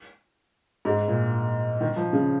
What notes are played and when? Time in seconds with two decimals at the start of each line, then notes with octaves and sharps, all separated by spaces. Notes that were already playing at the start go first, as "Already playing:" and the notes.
0.85 G#2
1.08 A#2
1.81 D#3
1.96 F3
2.13 C#3